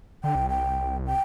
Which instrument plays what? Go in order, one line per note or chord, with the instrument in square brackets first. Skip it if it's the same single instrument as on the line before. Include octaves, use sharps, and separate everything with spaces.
[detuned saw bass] D3 [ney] G5
[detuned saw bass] C2
[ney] G5
G5